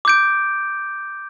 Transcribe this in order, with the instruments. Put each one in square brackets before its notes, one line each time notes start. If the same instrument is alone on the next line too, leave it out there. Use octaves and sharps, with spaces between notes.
[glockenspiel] D6 G6 D7